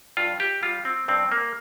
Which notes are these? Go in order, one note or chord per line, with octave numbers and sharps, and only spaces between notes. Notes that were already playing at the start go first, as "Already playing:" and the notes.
G2 F4
G4
G3 F4
C4
G2 C4
A#3